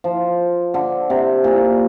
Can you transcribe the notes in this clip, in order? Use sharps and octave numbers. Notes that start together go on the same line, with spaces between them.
F3
D3
C3
A#2